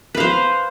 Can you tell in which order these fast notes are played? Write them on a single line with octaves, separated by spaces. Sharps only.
B4 F5 C5